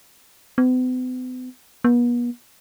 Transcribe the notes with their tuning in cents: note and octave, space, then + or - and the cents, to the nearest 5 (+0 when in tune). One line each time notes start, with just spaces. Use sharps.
B3 +45
B3 -40